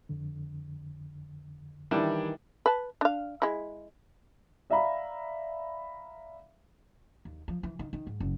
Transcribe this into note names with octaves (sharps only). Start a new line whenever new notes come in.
F2 D3
D#3 E3 G3 D4 E4
B4 A5
D4 F5
G#3 E4
D5 E5 F5 A#5 B5
D#2
F3
E3
D#3
D#3
G#2
F#1